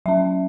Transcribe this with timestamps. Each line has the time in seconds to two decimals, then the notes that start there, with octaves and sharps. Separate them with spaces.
0.06 F#3 C#4 E5